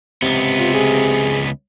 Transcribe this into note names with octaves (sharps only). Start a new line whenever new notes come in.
C#2 C3 B3
F4
G#4